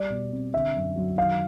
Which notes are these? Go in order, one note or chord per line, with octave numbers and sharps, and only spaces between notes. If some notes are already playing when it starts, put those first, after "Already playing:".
Already playing: G3 D5
B2
C4
D3 E5
F#2
F#3
D#3 F5